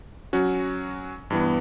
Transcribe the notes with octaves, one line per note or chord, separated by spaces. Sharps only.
F#3 C#4 F#4
G2 E3 B3